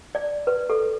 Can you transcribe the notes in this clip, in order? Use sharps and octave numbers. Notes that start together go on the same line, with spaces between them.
D5
B4
A4